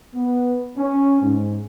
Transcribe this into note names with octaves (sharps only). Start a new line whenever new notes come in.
B3
C#4
G#2